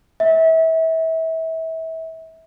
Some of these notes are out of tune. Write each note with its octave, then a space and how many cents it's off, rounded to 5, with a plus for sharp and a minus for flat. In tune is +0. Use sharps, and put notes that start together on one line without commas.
E5 -30